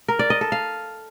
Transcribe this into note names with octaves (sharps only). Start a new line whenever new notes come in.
A#4
D5
D#5
A4
F5